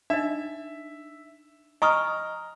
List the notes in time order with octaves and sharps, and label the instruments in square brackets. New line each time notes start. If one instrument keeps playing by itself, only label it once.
[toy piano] D4 D#4 D#5 [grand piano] E5
[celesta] D#5 D#6 F6 [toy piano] G#5 C#6 [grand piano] A#5